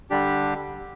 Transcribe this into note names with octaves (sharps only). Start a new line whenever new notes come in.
D3 G3 D4 G4